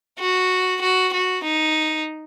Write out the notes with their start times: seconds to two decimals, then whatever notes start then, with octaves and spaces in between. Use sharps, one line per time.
0.20 F#4
0.82 F#4
1.13 F#4
1.44 D#4